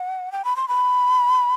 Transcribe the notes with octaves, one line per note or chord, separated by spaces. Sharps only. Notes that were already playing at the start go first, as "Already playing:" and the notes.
Already playing: F#5
G5
B5
C6
B5